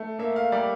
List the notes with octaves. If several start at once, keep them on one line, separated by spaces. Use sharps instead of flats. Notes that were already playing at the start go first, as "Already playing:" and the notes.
Already playing: A3
A#3 E5
F5
G3 D5